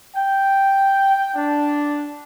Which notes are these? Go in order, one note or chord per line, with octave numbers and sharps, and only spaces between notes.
G5
D4